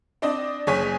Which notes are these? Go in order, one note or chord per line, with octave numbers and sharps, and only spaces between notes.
C4 D4 D5 D#5
F#1 G#4 C#5 G#5 B6